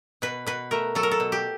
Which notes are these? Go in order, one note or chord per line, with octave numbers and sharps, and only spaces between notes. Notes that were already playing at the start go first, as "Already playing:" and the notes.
B2 B4
B2 B4
A3 A#4
F#3 A4
A#4
A4
B2
G4